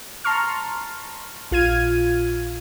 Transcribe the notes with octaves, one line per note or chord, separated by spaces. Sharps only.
A5 A#5 C6 C#6 F6
A#1 F4 F6 G#6 D#7